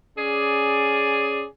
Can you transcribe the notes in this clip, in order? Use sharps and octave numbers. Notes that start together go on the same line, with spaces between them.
C#4 G#4 D5